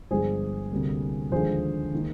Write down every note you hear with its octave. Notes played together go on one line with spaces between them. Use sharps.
G1 G2 F3 G#3 G#4 C5
D2 C3 G3 A#3
D#2 D3 F3 G#3 G#4 C5
D#3 A#3